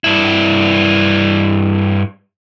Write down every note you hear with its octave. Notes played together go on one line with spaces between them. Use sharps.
G2 E4